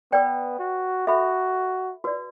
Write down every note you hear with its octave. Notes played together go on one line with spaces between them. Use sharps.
B3 B4 D5 G5
F#4
F#4 A4 E5 B5
F#4 B4 D5